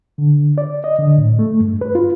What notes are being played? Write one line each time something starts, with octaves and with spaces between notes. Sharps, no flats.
D3
D5
D#5
D3
A2
A3
G2
B4
F4